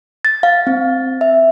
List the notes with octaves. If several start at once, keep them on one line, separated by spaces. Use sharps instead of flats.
A6
F5
C4
E5